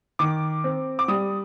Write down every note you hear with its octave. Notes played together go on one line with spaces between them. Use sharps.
D#3 D6
C4
D6
G3 D#6